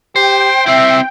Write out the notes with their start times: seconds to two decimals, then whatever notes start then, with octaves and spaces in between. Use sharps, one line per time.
0.16 G4 C5 G5
0.66 C4 E4 E5